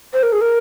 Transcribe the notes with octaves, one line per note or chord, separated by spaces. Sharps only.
C5
A#4
G#4
A#4